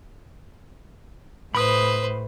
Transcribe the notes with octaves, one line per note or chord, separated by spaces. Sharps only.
A2 B4 C5 B5 D#6